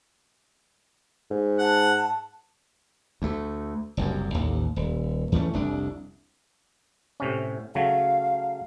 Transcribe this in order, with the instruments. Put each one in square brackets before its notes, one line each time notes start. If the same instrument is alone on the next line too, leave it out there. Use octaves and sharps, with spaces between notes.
[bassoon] G#2
[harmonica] F#5 [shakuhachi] A5
[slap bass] D2 A3
F#1 C2 F#2
A1 D#2
D#1
E2 E3 A3 C#4
F1 C2 D4
[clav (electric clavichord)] A2 C3 C#4
[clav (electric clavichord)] C#3 F#3 A3 [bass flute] F5